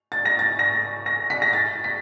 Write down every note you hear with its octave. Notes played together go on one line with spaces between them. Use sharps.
A6
A#6
A6
A#6
A#6
B6
A#6
A6
B6